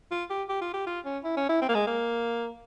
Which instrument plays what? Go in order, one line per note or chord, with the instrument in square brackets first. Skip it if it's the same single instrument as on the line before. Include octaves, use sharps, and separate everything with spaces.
[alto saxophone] F4
G4
G4
F4
G4
F4
C#4
E4
C#4
E4
C4
A#3
G#3
A#3